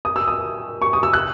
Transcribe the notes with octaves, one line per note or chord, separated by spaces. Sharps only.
D#6
E6
D#6
C#6
D#6
E6
F#6